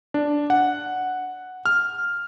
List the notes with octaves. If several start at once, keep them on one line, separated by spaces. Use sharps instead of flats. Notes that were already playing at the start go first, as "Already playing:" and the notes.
D4
F#5
F6